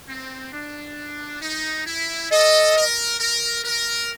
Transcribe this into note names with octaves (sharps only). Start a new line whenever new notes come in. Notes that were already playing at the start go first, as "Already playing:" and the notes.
C4
D4
D#4
E4
A4 D#5
A#4
A#4
A#4